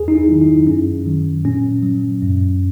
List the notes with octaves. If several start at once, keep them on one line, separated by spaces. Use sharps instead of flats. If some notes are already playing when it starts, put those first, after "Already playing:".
Already playing: E2 G#4
D#4
E4
D#3 F#3
D#4
F#2 C#4
D#3 F#3
A#2 C#4
F#3
F#2